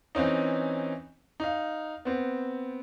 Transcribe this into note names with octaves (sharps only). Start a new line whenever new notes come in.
E3 C4 C#4 D#4
D#4 F5
B3 C4